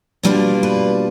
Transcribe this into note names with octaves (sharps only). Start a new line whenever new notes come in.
B2 G3 A#3 D4 F4 A4
B4